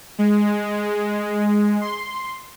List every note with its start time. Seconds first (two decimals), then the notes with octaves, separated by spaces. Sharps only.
0.19 G#3
1.81 C6